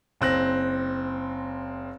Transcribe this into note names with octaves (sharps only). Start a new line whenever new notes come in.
F#1 C4 F#6 A#6